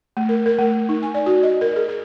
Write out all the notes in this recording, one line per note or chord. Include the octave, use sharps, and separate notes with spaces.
A3
A#4
A#4
A3
D#4
G#5
D5
F#4
D#5
A#4
G#4
G#4